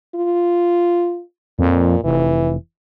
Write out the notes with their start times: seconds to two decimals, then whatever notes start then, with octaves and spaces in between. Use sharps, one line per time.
0.15 F4
1.59 F2 A#2
2.04 F1 E3